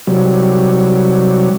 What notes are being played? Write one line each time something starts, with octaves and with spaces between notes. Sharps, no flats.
C3 F#3 G3